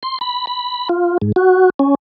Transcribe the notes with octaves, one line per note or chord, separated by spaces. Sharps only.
C6
B5
B5
F4
G#2
F#4
C#4